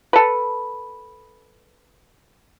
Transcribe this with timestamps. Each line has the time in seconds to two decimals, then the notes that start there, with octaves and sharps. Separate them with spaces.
0.13 A4 B4